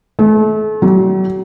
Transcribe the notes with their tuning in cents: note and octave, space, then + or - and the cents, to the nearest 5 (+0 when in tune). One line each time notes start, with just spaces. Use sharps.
A3 -35
F#3 +40